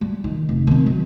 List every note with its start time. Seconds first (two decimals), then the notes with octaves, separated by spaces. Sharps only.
0.01 G3
0.24 D#3
0.49 F1
0.67 D#3 C4
0.86 F#3